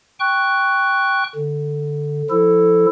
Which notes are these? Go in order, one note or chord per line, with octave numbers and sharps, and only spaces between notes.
G5 C#6 F#6
D3
F3 E4 A4